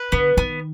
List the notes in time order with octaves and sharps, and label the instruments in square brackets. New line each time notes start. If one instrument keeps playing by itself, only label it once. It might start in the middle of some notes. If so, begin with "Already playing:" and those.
Already playing: [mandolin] B4
[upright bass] D3 [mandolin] B3
[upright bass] D#3 [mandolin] B3